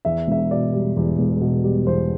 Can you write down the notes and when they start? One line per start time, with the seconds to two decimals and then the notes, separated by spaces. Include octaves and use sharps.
0.05 E2 E5
0.27 E1 E5
0.51 B2 D5
0.73 G3
0.96 E2
1.19 E1
1.41 B2
1.64 G3
1.86 E2 C5